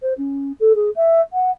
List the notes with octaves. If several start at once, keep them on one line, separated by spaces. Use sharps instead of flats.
C5
C#4
A4
G#4
E5
F#5